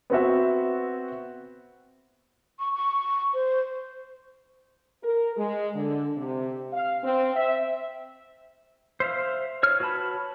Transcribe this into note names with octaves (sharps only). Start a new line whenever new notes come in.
B3 C4 F#4 E5
C#6
C#6
C5
A#4
G#3
D3
C3
F5
C4
E5
C5 E5 F5
C#5 F6
F#4 B4 C#5 A5 B5